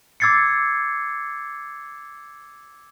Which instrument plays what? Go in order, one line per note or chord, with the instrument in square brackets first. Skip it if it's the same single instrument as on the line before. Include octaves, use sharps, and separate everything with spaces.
[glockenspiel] D6 E6 G#6 A6 C7 C#7